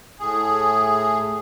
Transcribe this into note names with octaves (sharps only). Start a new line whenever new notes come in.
A2 G#4